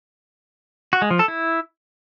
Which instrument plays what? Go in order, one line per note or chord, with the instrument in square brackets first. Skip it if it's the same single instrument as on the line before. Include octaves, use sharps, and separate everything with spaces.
[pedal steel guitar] F#4
G#3
F3
A4
E4